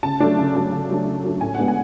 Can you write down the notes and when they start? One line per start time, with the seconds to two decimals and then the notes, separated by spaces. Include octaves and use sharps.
0.03 C#3 A5
0.20 F#3 A3 D4
0.38 C#3
0.55 F#3 A3 D4
0.72 C#3
0.89 F#3 A3 D4
1.06 C#3
1.24 F#3 A3 D4
1.41 A2 G#5
1.55 G#3 B3 D4 F#5
1.68 G#5